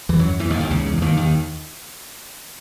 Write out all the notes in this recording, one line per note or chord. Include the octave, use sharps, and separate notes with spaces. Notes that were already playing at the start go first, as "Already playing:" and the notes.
E2 E3
F#2 F#3
E2 E3
D#2 D#3
D#2 D#3
C#2 C#3
E2
E3
D#2 D#3
D#2 D#3